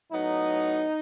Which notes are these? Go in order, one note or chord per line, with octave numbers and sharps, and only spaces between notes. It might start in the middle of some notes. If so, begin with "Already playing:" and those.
A2 F#3 B3 D#4